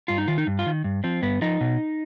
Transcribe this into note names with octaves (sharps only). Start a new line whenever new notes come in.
G2 F4
D#4
D#3 F4
D#4
G2
F4
D#3
G2
F3 C4
G2 B3
F3 D#4
B2